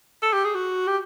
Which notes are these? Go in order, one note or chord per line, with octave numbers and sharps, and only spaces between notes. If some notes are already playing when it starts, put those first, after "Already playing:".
A4
G4
G#4
F#4
G4